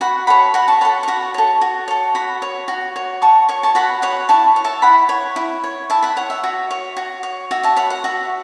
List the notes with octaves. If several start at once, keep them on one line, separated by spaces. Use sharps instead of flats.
F#4 F#5 B5
A4 C#5 F#5 B5
F#4 F#5 B5
A5 C#6
A4 C#5 F#5 B5
C#6
F#4 F#5 B5
A4 C#5
F#4
A4 C#5
F#4 F#5 B5
C#5
F#4
C#5
F#4 A5 C#6
C#5 C#6
A5 C#6
F#4 F#5 B5
C#5 F#5 B5
E4 A5 C#6
C#5
E5 A5
E4 F#5 B5
C#5
E4
C#5
E4 E5 A5
F#5 B5
C#5 F#5
E5
F#4
C#5
F#4
C#5
F#4 E5
E5 A5
C#5 F#5 B5
F#5
F#4 E5